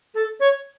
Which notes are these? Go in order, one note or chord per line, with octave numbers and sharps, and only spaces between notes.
A4
C#5